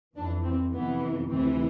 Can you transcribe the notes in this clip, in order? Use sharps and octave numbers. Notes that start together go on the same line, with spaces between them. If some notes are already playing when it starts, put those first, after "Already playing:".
F2 E3 D4
C4
F2 C3 E3 B3
D2 C3 E3 C4